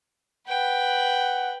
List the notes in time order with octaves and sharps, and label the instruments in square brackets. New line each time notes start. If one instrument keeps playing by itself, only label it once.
[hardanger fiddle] B4 G5 [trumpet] F#5